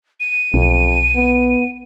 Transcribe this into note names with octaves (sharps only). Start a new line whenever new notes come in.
D#7
B1 F2
B3